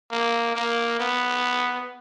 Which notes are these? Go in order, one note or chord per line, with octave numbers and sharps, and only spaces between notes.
A#3
A#3
B3